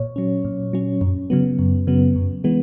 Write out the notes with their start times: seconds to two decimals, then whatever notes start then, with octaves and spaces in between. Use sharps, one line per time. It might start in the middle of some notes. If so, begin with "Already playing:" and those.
Already playing: A#2 C#5
0.16 F#3 C#4
0.45 A#2
0.73 F#3 C#4
1.01 F#2
1.30 C#3 F#3 B3
1.59 F#2
1.87 C#3 F#3 B3
2.16 F#2
2.44 E3 G#3 B3